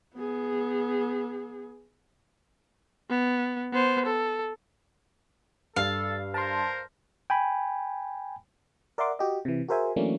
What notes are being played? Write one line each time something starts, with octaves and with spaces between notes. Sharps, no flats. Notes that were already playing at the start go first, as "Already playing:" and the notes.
B3 G#4
B3
B3 C5
A4
G2 A4 F5 E6 C7
A#4 C5 A5 C6
G5 G#5 B5
A#4 D5 E5 F#5 C6 D6
F#4 G4 D#5
C3 E3
F#4 G#4 A#4 C5 E5 G#5
E3 F#3 A3 A#3 C#4 D4